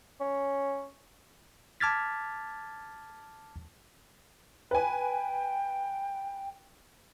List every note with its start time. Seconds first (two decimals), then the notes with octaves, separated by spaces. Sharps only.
0.21 C#4
1.80 A5 D6 F6 G#6 A6 B6
4.71 B4 G5 G#5